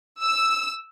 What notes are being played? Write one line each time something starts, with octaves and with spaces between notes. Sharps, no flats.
E6